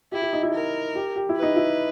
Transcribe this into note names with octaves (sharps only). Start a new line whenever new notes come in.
E4 G4
G4
D#4
E4
A#4
G4
G4
E4
B4
D#4
E4